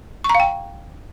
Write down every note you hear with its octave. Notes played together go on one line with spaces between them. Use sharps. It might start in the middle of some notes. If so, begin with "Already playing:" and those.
C#6
A#5
F5
G5